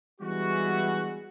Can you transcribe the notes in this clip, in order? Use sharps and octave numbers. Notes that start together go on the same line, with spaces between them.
E3 G3 G#3 B3 F#4